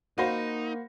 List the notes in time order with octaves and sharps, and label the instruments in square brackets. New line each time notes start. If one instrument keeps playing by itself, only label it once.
[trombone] A#3 [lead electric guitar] D#4 [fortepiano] F#4 C5 [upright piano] F5 B5 A#6